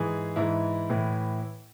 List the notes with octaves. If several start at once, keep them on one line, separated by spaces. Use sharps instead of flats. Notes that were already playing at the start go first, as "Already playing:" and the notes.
Already playing: G#2 E3 G#4
G#2 E3 E4
A2 E3